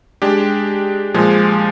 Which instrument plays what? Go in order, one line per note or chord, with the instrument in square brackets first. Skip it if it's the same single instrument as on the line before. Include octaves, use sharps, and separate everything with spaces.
[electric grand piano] G#3 D4 G4
A#2 F3 G#3